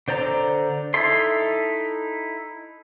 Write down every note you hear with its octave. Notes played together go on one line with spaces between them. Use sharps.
D3 C5 D5 A#5
D#4 E4 A4 E5 C6